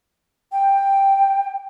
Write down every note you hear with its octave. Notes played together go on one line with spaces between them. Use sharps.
G5